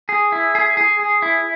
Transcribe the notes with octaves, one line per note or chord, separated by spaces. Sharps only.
G#4
E4
G#4
G#4
G#4
E4